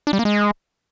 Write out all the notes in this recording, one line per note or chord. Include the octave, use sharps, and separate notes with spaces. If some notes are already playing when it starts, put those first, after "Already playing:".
D4
G3
A#3
G#3